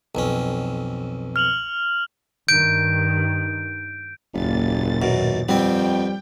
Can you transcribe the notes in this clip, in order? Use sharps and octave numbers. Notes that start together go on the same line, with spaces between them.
B1 F2 C#4
F6 F7 F#7
G2 D#3 G6 D7
F#1 D#2 A#2 A6
F#2 B2
F2 G3 B3 C4 G5